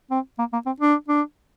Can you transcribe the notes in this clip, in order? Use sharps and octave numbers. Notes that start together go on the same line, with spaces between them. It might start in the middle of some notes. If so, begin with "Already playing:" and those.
C4
A#3
A#3
C4
D4
D4